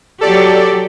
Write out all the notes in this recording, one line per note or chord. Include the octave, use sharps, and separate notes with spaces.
F#3 G4 A4 D5